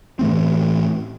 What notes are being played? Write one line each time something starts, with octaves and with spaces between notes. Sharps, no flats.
A2 E3 A3 C4